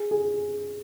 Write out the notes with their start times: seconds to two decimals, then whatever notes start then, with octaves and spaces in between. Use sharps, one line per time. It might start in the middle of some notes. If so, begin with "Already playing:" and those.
Already playing: G#4
0.11 G#4